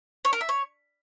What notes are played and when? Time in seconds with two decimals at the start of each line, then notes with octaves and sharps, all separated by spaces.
0.25 C#5
0.33 A#4
0.41 E5
0.49 C#5